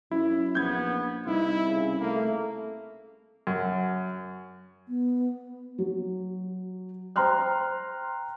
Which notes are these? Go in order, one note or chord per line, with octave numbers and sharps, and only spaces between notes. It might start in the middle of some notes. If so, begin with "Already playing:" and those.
F#2 E4
A#1 B3 G6 G#6
C2 D#4 E4
C#3
A3 A#3
F#2
B3
F#3
C5 G5 A#5 C6 F6 F#6